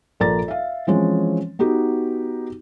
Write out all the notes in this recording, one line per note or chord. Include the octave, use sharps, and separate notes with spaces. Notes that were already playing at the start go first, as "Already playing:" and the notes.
A#1 A4 A#4 D5 A#5 A6
E5 F5
E3 F3 G#3 C4 C#4
B3 D#4 F#4 G4